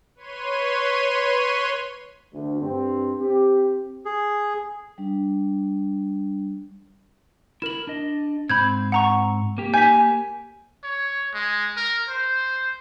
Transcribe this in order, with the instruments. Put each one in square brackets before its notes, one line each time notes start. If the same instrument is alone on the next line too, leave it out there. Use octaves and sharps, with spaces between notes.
[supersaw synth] B4 C#5 C6 D#7
[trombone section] D2
G2 C4
C4 G4
[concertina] G#4
[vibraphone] G3 D4
[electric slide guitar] E4 A#4 [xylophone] E7 F#7
[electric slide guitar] D4 D#5
[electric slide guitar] G#2 C4 [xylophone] B5 G6 G#6
[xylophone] F#5 A#5 C#6
[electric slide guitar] A#3 G4
[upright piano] G#5 [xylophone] G6 B6
[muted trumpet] C#5
G#3
A#4
C5